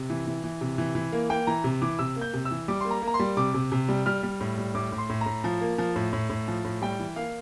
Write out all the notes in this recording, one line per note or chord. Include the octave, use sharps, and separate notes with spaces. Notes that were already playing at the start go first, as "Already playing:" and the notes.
Already playing: C3
E3
E3
E3
C3
E3
E3
A#3
A#3 G5
E3 A#5
C3
E3 D6
C3 E6
A#3
G6
C3
E6
E3
G3 D6
A#3 C6
A#5
A#3
A#5
C6
G3
C3 D6
C3
C3
G3
G3 F6
G3
A2
G3
A2 D6
A2
C6
A2
A#5
A2
F3
A#3
F3
A2
A2
A2
F3
A2
G3 G5
E3
A#3 F5